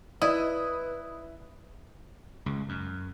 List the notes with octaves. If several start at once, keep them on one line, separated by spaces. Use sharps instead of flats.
E4 B4 D5 D#5 D#6
C#2
F#2